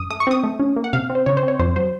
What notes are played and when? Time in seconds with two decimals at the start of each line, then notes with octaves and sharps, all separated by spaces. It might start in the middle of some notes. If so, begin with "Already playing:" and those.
Already playing: F#2 D#6
0.10 A3 D#6
0.20 C#6
0.27 C4 D#6
0.44 A3
0.60 C#4
0.76 A#3
0.84 F#5
0.93 C3 F5
1.10 C4
1.15 C5
1.26 C#3 C#5
1.37 C5
1.43 C4
1.48 C#5
1.59 F2 C5
1.76 F#3 C5